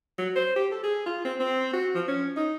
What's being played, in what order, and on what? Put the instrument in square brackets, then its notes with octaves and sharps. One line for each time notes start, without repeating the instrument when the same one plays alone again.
[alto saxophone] F#3
C5
G4
A4
G#4
F4
C4
C4
F#4
F3
C#4
D#4